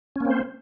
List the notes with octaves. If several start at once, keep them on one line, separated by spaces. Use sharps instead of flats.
A#3 C4 C#4 C5